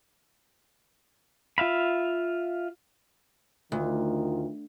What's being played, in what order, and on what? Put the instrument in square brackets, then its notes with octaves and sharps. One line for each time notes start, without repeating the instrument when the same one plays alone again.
[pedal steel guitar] F4 E5 F5 B5
[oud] D2 [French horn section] D#3 F4